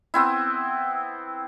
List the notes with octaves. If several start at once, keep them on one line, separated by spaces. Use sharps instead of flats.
B3 C4 E4